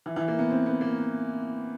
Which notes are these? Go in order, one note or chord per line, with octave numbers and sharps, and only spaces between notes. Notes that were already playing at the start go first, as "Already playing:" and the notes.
E3
E3
A#3
B3
C4
B3
A#3